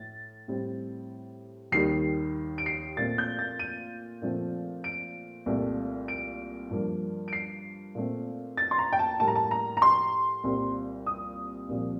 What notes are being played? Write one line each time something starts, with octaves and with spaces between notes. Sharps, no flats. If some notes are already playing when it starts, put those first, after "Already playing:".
Already playing: A2 A6
A2 G3 C4
D#2 D#3 G3 C7
D7
C7
A#2 A3 C4 A6
G6
A6
D#7
A#2 F3 A3 C4
D7
C2 A#2 A3
D7
G2 F3 A#3
D7
C7
A#2 A3 C4
A6
C6
A#5
G5
A5
A2 G3 A#3 A5
A#5
A5
A#5
A#5
C6
C2 A#2 G3 C4
D#6
C2 A#2 F3